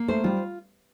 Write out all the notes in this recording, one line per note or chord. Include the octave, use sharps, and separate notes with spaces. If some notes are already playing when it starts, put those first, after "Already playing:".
Already playing: A#3
A3 C5
G3 F4